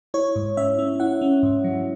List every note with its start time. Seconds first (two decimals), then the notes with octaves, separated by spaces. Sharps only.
0.14 E4 C#5
0.36 G#2
0.57 C#4 E5
0.79 C#4
1.00 E4 F#5
1.21 C#4
1.43 G#2
1.64 F#3